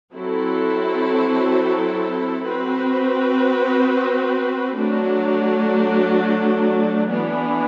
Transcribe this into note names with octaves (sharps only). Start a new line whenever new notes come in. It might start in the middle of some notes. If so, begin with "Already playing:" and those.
F#3 C4 E4 A4
C4 F#4 B4
F#3 A3 D4 F#4
E3 B3 D4